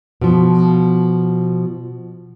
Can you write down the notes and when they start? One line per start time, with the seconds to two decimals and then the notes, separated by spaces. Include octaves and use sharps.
0.21 B2 F3